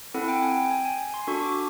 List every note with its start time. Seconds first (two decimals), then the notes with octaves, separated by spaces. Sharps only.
0.14 C4 E4 A4 F#5
0.28 G5
0.42 G#5
0.57 G5
0.71 G#5
0.85 G#5
1.14 C6
1.27 D4 F#4 A4 C#6
1.42 D6